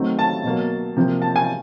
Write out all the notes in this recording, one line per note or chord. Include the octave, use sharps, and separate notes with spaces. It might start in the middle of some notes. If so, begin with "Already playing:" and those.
Already playing: D#3 F#3 A3 C4
A5
B2 F#3 A#3
C3 F3 A#3
A5
G#5